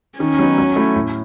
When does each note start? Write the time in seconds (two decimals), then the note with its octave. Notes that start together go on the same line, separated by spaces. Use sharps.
0.19 D#3 C#4
0.39 F#3 B3 D#4
0.58 F#3
0.76 A3 E4
0.96 A2